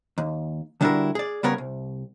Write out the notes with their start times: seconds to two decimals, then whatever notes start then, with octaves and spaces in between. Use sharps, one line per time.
0.18 D#2
0.81 D3 G3 D4 E4 F#4 A#4
1.15 G#4 D5
1.43 C#3 G3 B3 A#4 C#5
1.58 C2